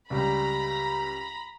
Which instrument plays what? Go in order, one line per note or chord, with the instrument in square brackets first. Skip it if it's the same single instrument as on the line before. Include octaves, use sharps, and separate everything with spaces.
[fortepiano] C#2 G3 [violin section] A#5 B5